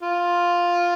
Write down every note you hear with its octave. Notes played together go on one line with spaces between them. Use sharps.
F4